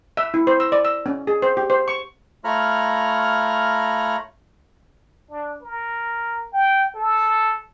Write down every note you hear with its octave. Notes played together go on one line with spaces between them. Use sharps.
E5
E4
C5
E6
D5
E6
C#4
G#4
C5
G4
C5
C#6
A3 F4 C#5 A#5 B5 F6
D4
A#4
G5
A4